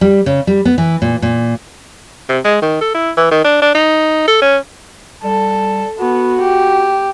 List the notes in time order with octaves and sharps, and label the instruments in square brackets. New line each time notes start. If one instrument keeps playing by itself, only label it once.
[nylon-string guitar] G3
C#3
G3
B3
E3
A#2
A#2
[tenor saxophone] C3
G#3
D#3
A4
E4
E3
D#3
D4
D4
D#4
A4
C#4
[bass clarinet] G3 [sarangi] A4
[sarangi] B3 [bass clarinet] F#4
[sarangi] G4